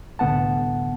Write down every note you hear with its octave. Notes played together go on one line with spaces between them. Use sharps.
C2 A2 D3 B3 F#5 A5